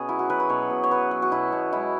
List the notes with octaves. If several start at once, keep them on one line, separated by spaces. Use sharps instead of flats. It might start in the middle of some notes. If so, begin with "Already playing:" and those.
Already playing: B2 B3 C#4 G#4
F#3 E4
F#4
F#3 B4
B4
B2 C#5
B2
C#5
F#3 B4
F#3
F#4
B2 E4
B2
G#3 E4